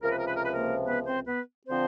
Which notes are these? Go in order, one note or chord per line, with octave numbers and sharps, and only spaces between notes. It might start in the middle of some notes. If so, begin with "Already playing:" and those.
C#2 C3 F3 A#4
B4
A#4
B4
A#4
B4
A#3 A#4
B3 B4
C4 C5
B3 B4
D3 F3 C4 C5